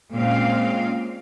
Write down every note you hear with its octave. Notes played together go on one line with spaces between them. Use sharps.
A#2 G#3 A#3 C4 C#4 F5